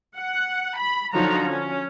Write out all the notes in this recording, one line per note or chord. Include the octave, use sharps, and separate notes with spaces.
F#5
B5
D3 F3 F#3 D#4 F#4 A#5
C#4